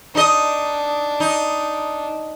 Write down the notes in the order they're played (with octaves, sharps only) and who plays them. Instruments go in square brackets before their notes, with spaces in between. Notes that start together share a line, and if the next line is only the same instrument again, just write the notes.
[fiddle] D4 [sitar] D#4 D#5
[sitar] D#4